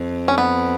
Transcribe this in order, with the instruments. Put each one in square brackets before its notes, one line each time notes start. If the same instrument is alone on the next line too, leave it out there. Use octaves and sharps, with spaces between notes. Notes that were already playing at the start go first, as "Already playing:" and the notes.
Already playing: [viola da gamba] F2
[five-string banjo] C#4
B3